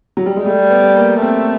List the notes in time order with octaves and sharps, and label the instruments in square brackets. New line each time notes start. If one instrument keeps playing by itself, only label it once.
[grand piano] F#3
G3
G#3
[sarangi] G3 [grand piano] A3
[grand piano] B3
A#3
[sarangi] A3 [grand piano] C4